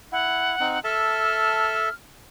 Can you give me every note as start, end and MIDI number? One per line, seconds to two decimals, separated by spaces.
0.12 0.56 64
0.12 0.80 78
0.60 0.79 60
0.60 0.79 63
0.84 1.89 69
0.84 1.89 76
0.84 1.89 81
0.84 1.94 89